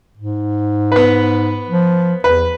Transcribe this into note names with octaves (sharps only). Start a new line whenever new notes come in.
G#2
B3 B4
F3
E2 B4